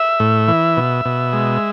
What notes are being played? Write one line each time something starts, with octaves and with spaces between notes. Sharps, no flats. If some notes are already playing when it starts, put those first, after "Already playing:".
Already playing: E5
A2
E3
B2
B2
G#3